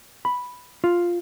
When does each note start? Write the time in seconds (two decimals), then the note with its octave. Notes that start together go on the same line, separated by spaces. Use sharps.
0.25 B5
0.84 F4